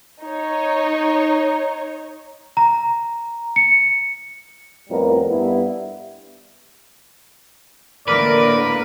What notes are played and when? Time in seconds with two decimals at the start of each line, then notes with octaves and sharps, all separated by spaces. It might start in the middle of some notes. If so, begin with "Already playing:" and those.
0.21 D#4 C#5
2.57 A#5
3.56 C#7
4.90 F2 A2 G3 B3 A#4
5.30 G2 B3 E4
8.08 A2 D3 A#3 A#4 B4 D5